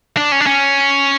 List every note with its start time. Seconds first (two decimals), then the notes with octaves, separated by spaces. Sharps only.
0.17 D4
0.32 C#4
0.40 D4
0.46 C#4